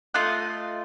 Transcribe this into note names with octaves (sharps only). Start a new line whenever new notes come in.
A3 F4 D#5 F#6